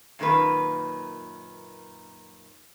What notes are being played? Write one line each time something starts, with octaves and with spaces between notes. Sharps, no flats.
F#2 A#2 D#3 A#3 B4